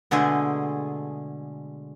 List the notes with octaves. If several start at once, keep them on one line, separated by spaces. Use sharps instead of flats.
B2 D3 G#3 A3 G#4